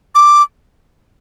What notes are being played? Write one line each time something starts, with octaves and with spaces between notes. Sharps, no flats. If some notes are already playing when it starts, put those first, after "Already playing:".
D6